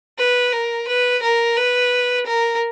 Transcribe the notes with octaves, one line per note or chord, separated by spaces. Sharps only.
B4
A#4
B4
A#4
B4
A#4